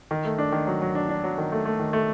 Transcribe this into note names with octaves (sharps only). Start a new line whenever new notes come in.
D#3
A3
D4
D#3
F#3
F#3
D4
D4
F#3
D#3
A3
A3
D#3
A3